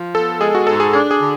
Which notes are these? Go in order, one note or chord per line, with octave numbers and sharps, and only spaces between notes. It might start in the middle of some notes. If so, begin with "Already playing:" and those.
Already playing: F3
B3 A4
G#3 G#4
F#4
G#2 A4
G#4
D4 G#4
G#4
D3